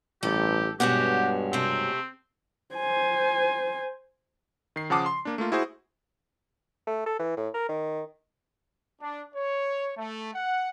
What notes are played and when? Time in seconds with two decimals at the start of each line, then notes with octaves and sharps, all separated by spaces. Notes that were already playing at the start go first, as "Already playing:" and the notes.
0.23 A1 G2 G4 A4
0.80 G2 B2 G#3 C#4 F#4 G4 F#5
1.53 C3 A3 C4
2.75 C5 G#5
4.76 D#3 C7
4.90 C#3 F3 F#5 A5 D6 D#6
5.06 C6
5.25 A#3 D4
5.38 A3 A#3 F4
5.52 E4 F#4 G#4 C5
6.87 A3
7.06 A4
7.19 E3
7.37 A2
7.54 A#4
7.69 D#3
9.00 D4
9.35 C#5
9.97 A3
10.35 F#5